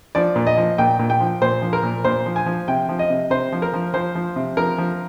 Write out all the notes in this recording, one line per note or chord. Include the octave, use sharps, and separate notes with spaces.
F3 D5
A#2
D#5
F3
A#2 G5
A#2
G5
F3
A#2 C5
F3
A#4
A#2
A#2 C5
F3
G#5
F3
C3 G5
F3
D#5
C3
C3 C5
F3
A#4
F3
F3 C5
F3
C3
F3 A#4
F3